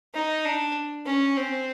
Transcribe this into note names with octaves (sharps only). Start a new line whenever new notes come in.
D#4
D4
C#4
C4